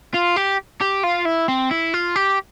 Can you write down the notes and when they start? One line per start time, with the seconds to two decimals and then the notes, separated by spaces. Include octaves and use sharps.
0.14 F4
0.36 G4
0.81 G4
1.04 F4
1.26 E4
1.48 C4
1.71 E4
1.94 F4
2.16 G4